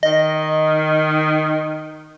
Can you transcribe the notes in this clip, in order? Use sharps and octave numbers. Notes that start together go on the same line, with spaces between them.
D#3 D#5